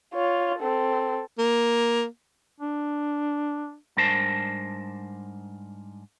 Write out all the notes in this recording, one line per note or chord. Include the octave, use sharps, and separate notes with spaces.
F4 C#5
C4 A4
A#3
D4
G#2 G3 D4 A#4 C5 A5